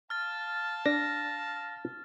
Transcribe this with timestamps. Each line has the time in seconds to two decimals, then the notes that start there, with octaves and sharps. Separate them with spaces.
0.10 F5 A5 F6 A6
0.86 D4 A#6